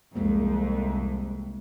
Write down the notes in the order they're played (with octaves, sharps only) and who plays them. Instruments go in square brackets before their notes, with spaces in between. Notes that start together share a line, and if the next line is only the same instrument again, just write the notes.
[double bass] C2 [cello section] F2 [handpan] G#3 A#3